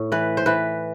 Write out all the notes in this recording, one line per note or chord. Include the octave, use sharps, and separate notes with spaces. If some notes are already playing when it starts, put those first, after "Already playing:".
Already playing: A2
E3 B4
C5
E3 B4